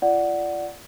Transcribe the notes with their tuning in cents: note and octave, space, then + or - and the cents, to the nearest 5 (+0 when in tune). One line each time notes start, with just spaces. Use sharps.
F4 -35 D5 +0 F#5 +0